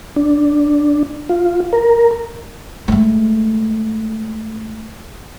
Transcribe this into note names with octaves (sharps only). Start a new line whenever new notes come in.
D4
F4
A#4
G#3 A3